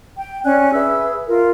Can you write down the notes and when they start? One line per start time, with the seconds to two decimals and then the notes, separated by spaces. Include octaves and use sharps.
0.15 G5
0.44 C#4 D5 G#5 F#6
0.72 G#4 B4 E5 E6
1.26 F4 A#4